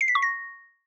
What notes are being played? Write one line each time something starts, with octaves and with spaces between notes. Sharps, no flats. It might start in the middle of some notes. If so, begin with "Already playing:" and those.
C7
B6
C#6
A#6